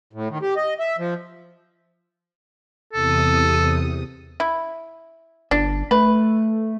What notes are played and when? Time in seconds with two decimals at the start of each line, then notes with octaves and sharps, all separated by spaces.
0.13 A2
0.30 D#3
0.42 G4
0.57 D#5
0.80 E5
0.98 F3
2.93 E2 C3 A4 D#6
4.40 E4
5.51 G1 D4
5.91 A3 B4